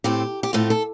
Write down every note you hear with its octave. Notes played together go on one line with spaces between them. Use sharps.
A2 A3 C4 G4
G4
A2 A3 C4 F4
A4